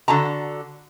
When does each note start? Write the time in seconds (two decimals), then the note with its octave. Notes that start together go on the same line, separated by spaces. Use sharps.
0.08 D3 F#4 A5 A#5